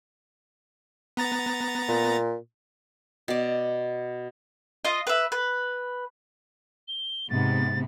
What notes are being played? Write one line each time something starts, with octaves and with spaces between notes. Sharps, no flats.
B3 A#5 A6
A#2
B2 D5
F4 D#5
B4 E5
B4
G7
G#2 C3 B3 A6